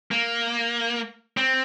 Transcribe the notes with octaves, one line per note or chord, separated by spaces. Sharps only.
A#3
C4